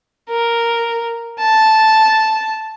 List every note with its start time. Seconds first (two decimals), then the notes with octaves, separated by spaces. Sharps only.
0.30 A#4
1.40 A5